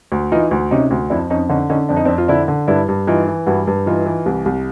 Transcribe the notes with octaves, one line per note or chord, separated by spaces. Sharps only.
D2
E3 D#4 F4
D2
C3 C#4 D#4
D2
F2 D4 E4
F2 C#4 D#4
D3 C#4 D#4
D3 C#4 D#4
F2 D4
D#4
C4 D4
F2
F4
D3 D4 E4
D3
G2 D4 E4
G2
E3 D#4 F4
E3
G2 E4 F#4
G2
E3 D#4 F4
E3
C2
C2